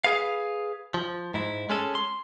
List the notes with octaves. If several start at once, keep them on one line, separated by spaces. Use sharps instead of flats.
G#4 B4 F5
F3
G#2 E4
G#3 C#4 A4
C6